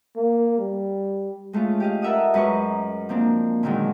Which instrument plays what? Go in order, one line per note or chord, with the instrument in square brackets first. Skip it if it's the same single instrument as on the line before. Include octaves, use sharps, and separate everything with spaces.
[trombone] A#3
G3
[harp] G#3 A3 C#4 F4
G4 D#5 F5
A4 A#4 E5 F#5 D#6
F#2 G#3 B4 D#5 A#5 C#6
F3 A#3 C4 D4
A#2 D3 D#3 F#3 G#3